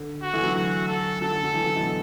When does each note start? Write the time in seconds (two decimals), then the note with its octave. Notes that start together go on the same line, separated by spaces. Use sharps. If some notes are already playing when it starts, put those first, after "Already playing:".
Already playing: D3
0.22 F#4
0.33 E3 A3
0.43 D3 F#3
0.55 F#4
0.88 A4
1.21 D3 F#3 A4
1.32 D3 F#3
1.43 D3 F#3
1.53 E3 A3
1.64 D3 F#3
1.76 B2 E3
1.87 D3